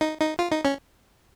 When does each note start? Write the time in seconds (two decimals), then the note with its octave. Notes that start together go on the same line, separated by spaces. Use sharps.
0.01 D#4
0.20 D#4
0.39 F4
0.51 D#4
0.65 C#4